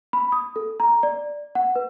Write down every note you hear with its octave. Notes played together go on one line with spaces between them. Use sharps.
B5
D#6
A4
A#5
D5
F#5
B4